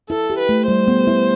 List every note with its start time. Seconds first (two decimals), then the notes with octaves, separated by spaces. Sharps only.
0.10 E4 A4
0.30 G4
0.39 B4
0.49 A3
0.68 G3 C5
0.88 B3
1.07 E4